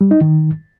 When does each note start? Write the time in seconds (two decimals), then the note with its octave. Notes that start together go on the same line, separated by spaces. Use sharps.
0.01 G3
0.11 D#4
0.21 D#3